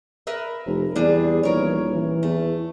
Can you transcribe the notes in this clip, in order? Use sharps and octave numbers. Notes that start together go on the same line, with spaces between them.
A#4 B4 E5
F1
E2 G3 D4 G#4
D#1 E3 A#4 C#5
E3
E2 A3